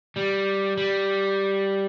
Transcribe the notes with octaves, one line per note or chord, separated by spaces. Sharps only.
G3
G3